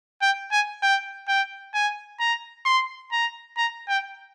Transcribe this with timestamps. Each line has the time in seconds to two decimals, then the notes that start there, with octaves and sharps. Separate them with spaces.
0.22 G5
0.52 G#5
0.82 G5
1.28 G5
1.74 G#5
2.20 A#5
2.65 C6
3.12 A#5
3.57 A#5
3.89 G5